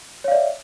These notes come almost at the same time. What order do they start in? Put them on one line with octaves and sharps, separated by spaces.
C#5 F5 D5 E5